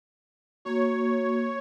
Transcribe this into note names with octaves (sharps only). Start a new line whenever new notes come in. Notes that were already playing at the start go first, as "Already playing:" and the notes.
A#3 F#4 C#5